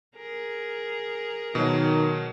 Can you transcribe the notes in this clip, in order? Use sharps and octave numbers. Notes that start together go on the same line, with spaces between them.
G#4 A#4
B2 D#3 F#3